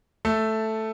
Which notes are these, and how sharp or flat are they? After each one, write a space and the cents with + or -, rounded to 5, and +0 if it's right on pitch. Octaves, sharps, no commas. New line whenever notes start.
A3 +0 A4 +0